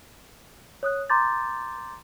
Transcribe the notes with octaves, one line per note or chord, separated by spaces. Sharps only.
C#5 D#6 F#6
A#5 C6 D6 G6 A6